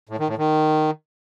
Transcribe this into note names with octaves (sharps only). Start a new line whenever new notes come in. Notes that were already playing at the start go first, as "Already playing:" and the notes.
A2
D#3
A2
D#3